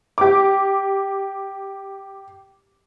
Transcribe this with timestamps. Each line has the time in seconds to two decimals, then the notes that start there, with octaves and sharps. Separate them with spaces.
0.18 G4 D6